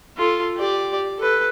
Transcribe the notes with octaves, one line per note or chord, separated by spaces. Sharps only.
F4 A4
G4 D5
A4 B4